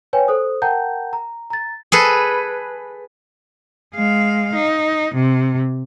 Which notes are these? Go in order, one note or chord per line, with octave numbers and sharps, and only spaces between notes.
B4 C#5 G5 G#5
A4 C5 D#6
A#4 F#5 G5 A5 A#5 G6
A#5
A#5 A6
G#4 A4 B4
G#3 F5
D#4
C3